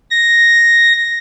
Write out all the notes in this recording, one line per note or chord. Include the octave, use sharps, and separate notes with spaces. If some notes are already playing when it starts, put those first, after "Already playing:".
A#6